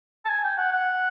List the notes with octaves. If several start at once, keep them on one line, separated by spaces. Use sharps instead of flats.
A5
G#5
G5
F#5
F#5